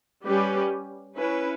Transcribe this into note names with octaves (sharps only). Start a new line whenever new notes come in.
G3 C#4 G4 B4
C#4 E4 B4